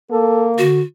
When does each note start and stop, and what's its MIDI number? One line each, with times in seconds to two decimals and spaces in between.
0.11 0.63 58
0.11 0.49 69
0.58 0.82 50
0.58 0.81 66